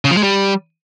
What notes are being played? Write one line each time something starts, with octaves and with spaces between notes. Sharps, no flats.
C#3
F3
G#3
G3